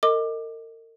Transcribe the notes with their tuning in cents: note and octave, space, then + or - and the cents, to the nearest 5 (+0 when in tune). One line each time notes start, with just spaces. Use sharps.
A#4 -40 D#5 +5 D6 +20